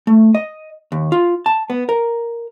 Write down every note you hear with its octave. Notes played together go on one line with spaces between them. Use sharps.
A3
D#5
D#2
F4
A5
B3
A#4